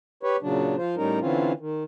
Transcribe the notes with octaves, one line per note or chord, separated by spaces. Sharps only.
G4 B4 C#5
A#2 C#3 F#3 D4
F3 F4 C5
A2 G3 C#4 D#4 A#4
D3 E3 C4 C#4 F4
D#3